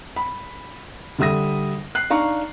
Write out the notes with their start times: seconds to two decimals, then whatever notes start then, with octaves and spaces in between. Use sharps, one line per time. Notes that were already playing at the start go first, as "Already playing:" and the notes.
0.16 B5
1.19 D3 G3 E5 D#6 A#6
1.95 F#6 C7
2.10 D4 D#4 F5 A#5 C#6